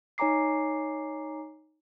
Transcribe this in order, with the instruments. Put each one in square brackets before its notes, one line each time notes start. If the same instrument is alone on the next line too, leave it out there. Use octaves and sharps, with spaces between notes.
[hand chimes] D#4 C#5 G#5 A#5 D6 C7